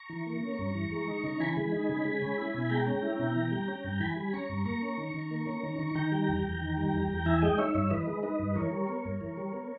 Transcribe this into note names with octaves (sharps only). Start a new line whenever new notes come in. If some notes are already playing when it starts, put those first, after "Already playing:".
Already playing: A#5 C#6
E3
A#3
C#4
G2
E3
G#3
D#4
C#3
E3 G#5 B5
G#3
D#4
C#3
G#3
C#4
E4
B2
G#3 G5 A#5
C#4
E4
B2
E3
G3
C#4
G2
E3 G#5 B5
G3
C#4 A#5 C#6
G2
A#3 A#5 C#6
C#4
D#3
D#3
A#3
C#4
D#3
D#3
D#3 G5 A#5
G3
E2
E2
D#3
G3
E2
E2
E3 E5 G#5
G#3 D#5 G5
D#4 C#5 E5
G2 C#5 E5
E3 B4 D#5
G#3
D#4 B4 D#5
G2
E3 A#4 C#5
G3
B3
G2
E3
G3
B3